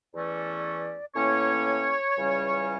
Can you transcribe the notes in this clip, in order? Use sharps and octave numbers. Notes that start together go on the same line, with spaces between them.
E2 E3 A3 C#4 D5
A2 E3 A#3 C#4 C#5
C#2 C#3 E3 G3 C#4